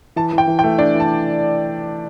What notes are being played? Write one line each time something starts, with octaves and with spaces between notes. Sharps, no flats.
E3 A5
E3
G5
E3
G5
A3
D4 D5
E3
A5